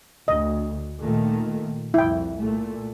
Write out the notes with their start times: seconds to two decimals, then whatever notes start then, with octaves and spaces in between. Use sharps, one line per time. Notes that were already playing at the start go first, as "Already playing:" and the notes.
0.28 D2 D#5
1.01 A#2 D#3 A3
1.94 C2 F2 E4 G5
2.42 A#2 A3